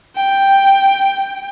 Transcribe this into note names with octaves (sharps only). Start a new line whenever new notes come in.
G5